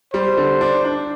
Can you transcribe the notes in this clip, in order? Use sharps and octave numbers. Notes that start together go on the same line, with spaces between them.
G3 C5
D3
D4
D4